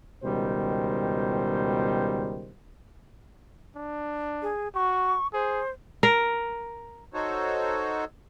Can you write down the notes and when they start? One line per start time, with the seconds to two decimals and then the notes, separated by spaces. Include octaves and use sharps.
0.24 C#2 B2 D#3 G3 C5
3.76 D4
4.42 G#4
4.75 F#4 C#6
5.34 G#4 C5
6.03 A#4
7.14 D#4 F#4 A4 C5 C#5